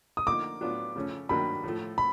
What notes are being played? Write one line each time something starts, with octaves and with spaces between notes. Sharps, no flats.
D#6
D3 F3 A#3 D#4 D6
A2 F#3 B3 D4 F4
C#3 F3 A3 C#4
G2 D#3 F#3 A#3 D4 B5
A2 F3 A3
B5